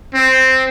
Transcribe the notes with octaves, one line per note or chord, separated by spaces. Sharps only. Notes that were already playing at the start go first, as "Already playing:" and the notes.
C4